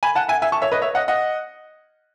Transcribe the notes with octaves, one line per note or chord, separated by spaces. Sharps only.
G#5 B5
F#5 A5
E5 G#5
E5 G#5
A5 C#6
C#5 E5
B4 D#5
C#5 E5
D#5 F#5
D#5 F#5